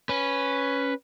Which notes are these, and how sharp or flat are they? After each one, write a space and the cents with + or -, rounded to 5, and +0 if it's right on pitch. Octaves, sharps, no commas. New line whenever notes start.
C#4 +0 B4 +0